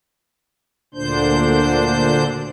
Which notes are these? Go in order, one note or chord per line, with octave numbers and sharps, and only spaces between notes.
D2 A#2 D3 D4 C5 G6